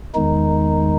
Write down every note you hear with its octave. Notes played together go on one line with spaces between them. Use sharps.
E2 D#3 G#3 D#4